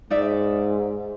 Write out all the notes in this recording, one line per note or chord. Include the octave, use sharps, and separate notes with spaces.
G#2 D#4 D5 E5